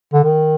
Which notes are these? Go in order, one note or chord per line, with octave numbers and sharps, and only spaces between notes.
D3
D#3